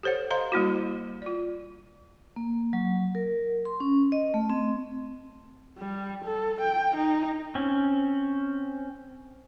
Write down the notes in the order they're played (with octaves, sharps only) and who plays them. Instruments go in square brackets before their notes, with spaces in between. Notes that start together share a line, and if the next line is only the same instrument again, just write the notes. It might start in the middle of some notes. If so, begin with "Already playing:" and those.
[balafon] G4 A4 C5 C#5 F#5
C5 D#5 F5 A#5 C6
G3 A#3 E4 F#4
F4 D5
[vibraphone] A#3
F#3
A#4
C6
C#4
D#5
A3
C4
[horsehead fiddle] G3
A4
G5
D#4
[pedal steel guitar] C4 C#4